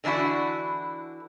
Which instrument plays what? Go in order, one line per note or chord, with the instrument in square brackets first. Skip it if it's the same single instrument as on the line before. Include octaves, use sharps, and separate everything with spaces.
[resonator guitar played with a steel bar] D3 E3 D4 E4 F#4